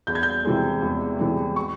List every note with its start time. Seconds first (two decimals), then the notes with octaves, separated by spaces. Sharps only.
0.07 E2 G6
0.15 G#6
0.23 G6
0.45 C3 E3 G#3
0.82 E2
1.19 C3 E3 G#3
1.56 C#6